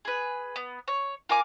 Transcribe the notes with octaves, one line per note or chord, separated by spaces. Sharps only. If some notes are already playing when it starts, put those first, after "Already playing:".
G#4 B4
B3
C#5
F4 A#4 G#5 D6